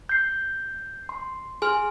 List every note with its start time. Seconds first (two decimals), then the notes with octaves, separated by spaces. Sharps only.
0.09 G6 C7
1.09 C6
1.62 G#4 G#5 C6 F6